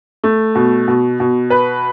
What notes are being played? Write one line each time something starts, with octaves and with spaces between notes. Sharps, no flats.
A3
B2
B2
B2
B4